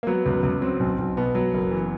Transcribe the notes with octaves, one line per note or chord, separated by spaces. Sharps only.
A#3
F#3 B3
C#2
C#2
F#3 C4
B1
B1
B2 B3
F#3
F#1
E3